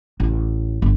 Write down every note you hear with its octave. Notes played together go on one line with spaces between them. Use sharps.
A1
G1